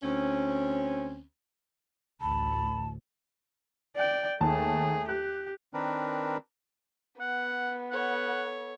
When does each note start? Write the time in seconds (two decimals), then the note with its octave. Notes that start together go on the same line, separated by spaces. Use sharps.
0.03 D2 C4 C#4
2.21 A1 D2 A5 B5
3.97 D5 G5
4.41 D#2 A3 G#4 A5
5.09 G4 F#6
5.74 D#3 C4 D4 A#4 B4
7.20 B3 F#5
7.91 A4 C#5 F#5